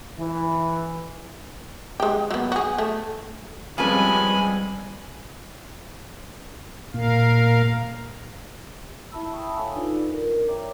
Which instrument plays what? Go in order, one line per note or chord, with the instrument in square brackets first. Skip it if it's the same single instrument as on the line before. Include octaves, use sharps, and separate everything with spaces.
[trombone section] E3
[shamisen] G#3 G4
F#3 B3
F#4 G#4
A3
[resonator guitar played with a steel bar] F3 C#4 B4 [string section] G3 G#3 C4 [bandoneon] G#5 B5
[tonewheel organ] A#2 [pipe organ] A#4 F5
[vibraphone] E4 E5 A5 B5 E6
E5 G5 A5 B5 C#6 D#6
A4 C#5 E5 F5 G#5 E6
D4 D#4 F4 A4 B4 D5
A#4
C#5 D5 E5 G5 A#5 D6